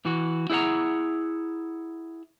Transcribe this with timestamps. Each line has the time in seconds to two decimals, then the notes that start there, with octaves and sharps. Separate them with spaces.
0.05 E3 F#4
0.50 E4 G#4 C5 F#5 A#5